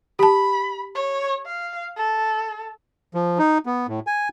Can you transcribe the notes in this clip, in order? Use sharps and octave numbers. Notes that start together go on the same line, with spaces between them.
G4 A5 B5
C#5
F5
A4
F3
D#4
B3
A2
G#5